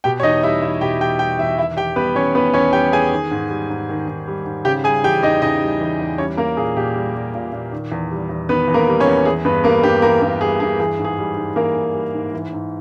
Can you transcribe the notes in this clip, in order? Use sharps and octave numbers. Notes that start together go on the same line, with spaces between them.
B2 G4 G5
C#5
E2 D#4 D#5
G3 E4 E5
E2 E4 E5
B2 G4 G5
E2 G4 G5
G3 G4 G5
E2 E4 E5
D#3 E4 E5
E2 G4 G5
G3 B3 B4
E2 C#4 C#5
D#3 B3 B4
E2 C#4 C#5
G3 G4 G5
E2 G#4 G#5
D#3
G#2
G3
G#2
D#3
G#2
G3
G#2
C#3 G4 G5
G3 G#4 G#5
E3 G4 G5
E2 D#4 D#5
C#3 D#4 D#5
G3
E3
E2
G3 C#4 C#5
G3 A#3 A#4
A#2 G#4
A#2 G4
G3
G3
A#2
A#2
D#3
E2
G3
E2
D#3 B3 B4
E2
A#3 A#4
G3
C#4 C#5
E2
E3 G#4
G2 B3 B4
G3 A#3 A#4
G2 G4
E3 A#3 A#4
G2 A#3 A#4
G3 G#4
G2 G#4
E3 G#4
G#2
G#4
G3
G#2
E3 A#3 A#4
G#2
G3
G#2
E3
G#2